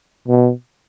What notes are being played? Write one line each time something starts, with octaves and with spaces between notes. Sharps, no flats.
B2